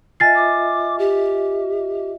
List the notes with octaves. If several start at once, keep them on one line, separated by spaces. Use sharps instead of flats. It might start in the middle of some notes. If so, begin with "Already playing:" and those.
F4 D#5 E5 G#5 A6 C7
D6
G4